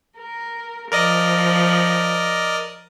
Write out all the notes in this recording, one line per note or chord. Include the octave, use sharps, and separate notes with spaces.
A#4
F3 A#4 D5 D#5